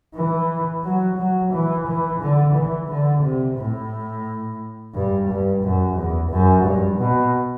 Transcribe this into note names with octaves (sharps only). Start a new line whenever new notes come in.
E3
F#3
F#3
E3
E3
D3
E3
D3
C3
A2
G2
G2
F#2
E2
F#2
G2
B2